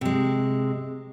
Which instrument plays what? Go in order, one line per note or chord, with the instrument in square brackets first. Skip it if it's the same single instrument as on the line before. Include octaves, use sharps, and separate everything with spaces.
[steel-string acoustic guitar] C3 G#3